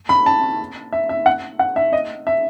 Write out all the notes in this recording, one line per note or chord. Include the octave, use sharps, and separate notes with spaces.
B5
A5
E5
E5
F#5
F#5
E5
D#5
E5